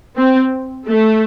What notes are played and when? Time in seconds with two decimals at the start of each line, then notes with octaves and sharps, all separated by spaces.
0.17 C4
0.86 A3